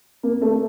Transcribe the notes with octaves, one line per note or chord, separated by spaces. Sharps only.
A#3
A3